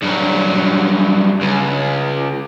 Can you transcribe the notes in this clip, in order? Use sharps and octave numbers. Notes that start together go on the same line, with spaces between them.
G2 F#3
C#2